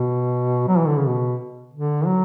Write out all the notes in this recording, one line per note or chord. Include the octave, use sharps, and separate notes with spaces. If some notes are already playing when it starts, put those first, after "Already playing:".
Already playing: B2
F#3
E3
D3
C#3
B2
D3
F#3